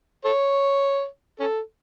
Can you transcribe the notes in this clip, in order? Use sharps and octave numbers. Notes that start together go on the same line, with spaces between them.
A4 C#5
C#4 A4